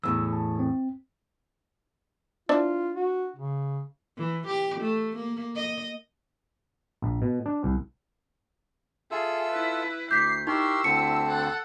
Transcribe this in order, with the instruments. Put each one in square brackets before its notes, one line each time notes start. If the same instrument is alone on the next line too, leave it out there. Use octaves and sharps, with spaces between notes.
[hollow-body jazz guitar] E2 A2 [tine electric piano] E6
[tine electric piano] A5
C4
[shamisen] D4 E4 C5 [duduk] F4
[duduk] F#4
C#3
[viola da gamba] E3
G4
A3
A#3
D#5
[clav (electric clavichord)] A#1
B2
D4
C2
[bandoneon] F4 A4 E6 [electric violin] G#4 [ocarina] E5
[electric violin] E4 B4
[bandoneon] D2 [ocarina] D6 [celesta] G6 B6 [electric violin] C7
[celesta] D#4 [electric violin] E4 E6 [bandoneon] G4 A#4 C6 [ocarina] C#6
[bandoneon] D2 D3 C4 [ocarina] A5 [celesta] C#7
[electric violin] A4 F#5